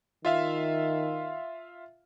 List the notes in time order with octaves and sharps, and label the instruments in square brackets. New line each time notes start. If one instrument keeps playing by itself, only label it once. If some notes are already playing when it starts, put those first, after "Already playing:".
[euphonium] D#3 [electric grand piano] F4 E5 F5